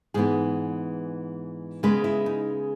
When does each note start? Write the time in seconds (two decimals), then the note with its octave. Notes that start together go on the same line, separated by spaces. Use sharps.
0.14 G#2 E3 B3 G#4
1.83 C#3 G#3 B3 B4
2.04 E4
2.26 D#4